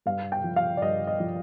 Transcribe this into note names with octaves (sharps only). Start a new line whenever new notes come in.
G2 F5
G5
F3
F5
D5
G2 D#5
D#5
F3